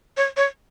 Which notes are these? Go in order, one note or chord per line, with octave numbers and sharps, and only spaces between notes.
C#5
C#5